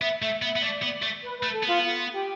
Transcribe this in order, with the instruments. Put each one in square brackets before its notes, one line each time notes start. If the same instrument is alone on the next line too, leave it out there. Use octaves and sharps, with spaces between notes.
[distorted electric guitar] B3 [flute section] E5
[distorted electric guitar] A3 [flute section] E5
[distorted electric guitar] B3 [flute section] E5
[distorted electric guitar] B3
[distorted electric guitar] A3 [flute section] D5
[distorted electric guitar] B3
A3
[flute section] B4
B4
[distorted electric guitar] A3
[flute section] A4
[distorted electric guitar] B3 [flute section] F4
[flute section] F4
G4